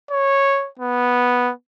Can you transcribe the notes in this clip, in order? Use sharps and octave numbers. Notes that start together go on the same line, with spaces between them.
C#5
B3